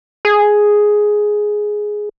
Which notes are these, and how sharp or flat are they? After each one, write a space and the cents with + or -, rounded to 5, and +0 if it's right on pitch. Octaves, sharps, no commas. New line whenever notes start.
G#4 +5